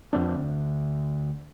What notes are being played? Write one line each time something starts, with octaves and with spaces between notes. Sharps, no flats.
F2 C4 D4
D2